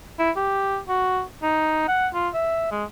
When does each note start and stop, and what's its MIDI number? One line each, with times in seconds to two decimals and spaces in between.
0.19 0.31 64
0.36 0.78 67
0.89 1.22 66
1.43 1.83 63
1.88 2.08 78
2.14 2.28 65
2.34 2.71 76
2.71 2.84 56